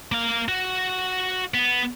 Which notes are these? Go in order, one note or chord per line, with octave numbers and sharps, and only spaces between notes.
A#3 F5
F#4
B3